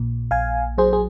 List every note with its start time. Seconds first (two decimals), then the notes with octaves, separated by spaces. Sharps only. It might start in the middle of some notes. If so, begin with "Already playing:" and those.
Already playing: A#1 A#2
0.31 A#1 F5 G#5
0.78 F#3 G#4 C5
0.93 G#4